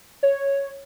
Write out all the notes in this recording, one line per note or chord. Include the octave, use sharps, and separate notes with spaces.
C#5